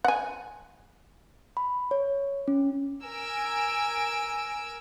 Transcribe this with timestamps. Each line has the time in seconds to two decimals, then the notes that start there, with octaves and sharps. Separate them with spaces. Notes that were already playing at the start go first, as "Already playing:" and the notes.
0.04 F#5 G#5
1.57 B5
1.91 C#5
2.48 C#4
3.04 A#4 G#5 E6 D7